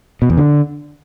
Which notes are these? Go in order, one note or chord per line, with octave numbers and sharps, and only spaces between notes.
B2
E2
D3